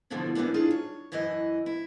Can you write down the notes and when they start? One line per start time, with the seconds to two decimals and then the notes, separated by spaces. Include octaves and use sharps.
0.10 G2 B2 D3 E3 F3 G3
0.35 D#3 E3 G3 B3 C#4 D4
0.54 D4 D#4 F4 G#4
0.71 C#5
1.12 F#2 E3 E4 D#5 G#5
1.66 E4